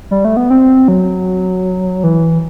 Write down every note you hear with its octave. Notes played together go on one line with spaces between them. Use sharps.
G3
A3
B3
C4
F#3
E3